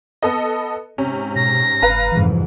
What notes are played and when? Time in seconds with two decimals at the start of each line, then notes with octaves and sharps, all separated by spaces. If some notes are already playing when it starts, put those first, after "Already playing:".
0.22 B3 A4 D#5
0.98 G#2 C3 C#4
1.36 B2 A#6
1.82 F#1 B4 F5 A#5
2.12 C2 F2 G#2 E3